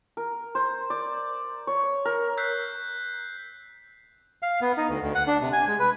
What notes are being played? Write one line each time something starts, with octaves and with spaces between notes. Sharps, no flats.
A#4
C5
D5
C#5
A#4
E6 F#6 G6 B6 C7
F5
B3
D#4
D2
D2
F#5
D4
C3
G#5
G#3
B4